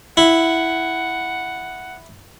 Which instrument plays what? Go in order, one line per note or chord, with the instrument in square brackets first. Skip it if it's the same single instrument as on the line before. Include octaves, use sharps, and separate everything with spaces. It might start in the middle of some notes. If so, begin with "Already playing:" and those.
[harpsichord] E4 [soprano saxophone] F#5